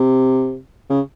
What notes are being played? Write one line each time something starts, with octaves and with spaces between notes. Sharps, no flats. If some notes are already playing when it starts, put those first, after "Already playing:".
Already playing: C3
C#3